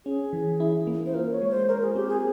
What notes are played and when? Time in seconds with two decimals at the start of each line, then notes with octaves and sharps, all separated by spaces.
0.06 C#4 G#4
0.33 E3
0.60 E4
0.87 A#3
1.06 C5
1.14 F4 A#4
1.32 C#5
1.42 G#3
1.50 C5
1.68 A#4 C5
1.82 G#4
1.95 C4 G4
2.09 G#4